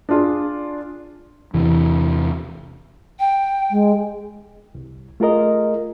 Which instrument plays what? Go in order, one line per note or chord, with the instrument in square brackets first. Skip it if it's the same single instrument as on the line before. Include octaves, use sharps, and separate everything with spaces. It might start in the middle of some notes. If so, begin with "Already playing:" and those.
[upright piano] D4 F4 G#4
[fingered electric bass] E2 C3 E3
[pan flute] G5
[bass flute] G#3
[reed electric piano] C2
A3 F4 G#4 A#4 D#5